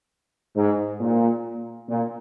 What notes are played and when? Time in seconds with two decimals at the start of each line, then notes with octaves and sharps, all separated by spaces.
0.56 G#2
1.01 A#2
1.89 A#2